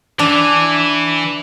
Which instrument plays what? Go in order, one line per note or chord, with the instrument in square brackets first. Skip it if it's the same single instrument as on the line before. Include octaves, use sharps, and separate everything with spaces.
[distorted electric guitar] E3 [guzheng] D4